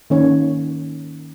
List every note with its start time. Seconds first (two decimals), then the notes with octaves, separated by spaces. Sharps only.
0.10 D#3 A#3 C#4 C#5